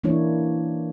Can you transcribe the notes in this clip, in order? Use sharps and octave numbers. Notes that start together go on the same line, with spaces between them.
E3 A#3 D4 E4 C#5